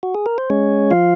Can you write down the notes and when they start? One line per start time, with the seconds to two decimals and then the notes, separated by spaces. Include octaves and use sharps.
0.03 F#4
0.15 G#4
0.26 A#4
0.38 C5
0.50 G#3 C#4 C#5
0.91 F3 F4 F5